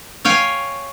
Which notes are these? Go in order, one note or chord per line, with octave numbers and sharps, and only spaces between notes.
C#5 F5 G5 G#5